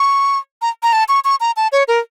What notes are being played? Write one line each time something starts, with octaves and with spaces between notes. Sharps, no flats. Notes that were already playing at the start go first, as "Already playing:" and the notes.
Already playing: C#6
A#5
A#5
A5
C#6
C#6
A#5
A5
C#5
A#4